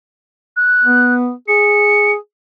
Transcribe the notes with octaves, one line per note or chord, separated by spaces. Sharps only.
F#6
B3
G#4 C#7